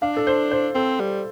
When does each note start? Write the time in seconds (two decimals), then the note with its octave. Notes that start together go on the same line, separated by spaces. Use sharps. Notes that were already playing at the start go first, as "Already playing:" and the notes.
0.02 D4 F5
0.17 A4
0.27 C5
0.51 C5
0.75 C4 A4
1.00 G3